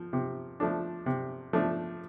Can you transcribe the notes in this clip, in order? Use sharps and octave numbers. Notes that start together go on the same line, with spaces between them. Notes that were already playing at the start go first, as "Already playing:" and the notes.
Already playing: F3
C3
F3 A3 D4
C3
F3 A3 D4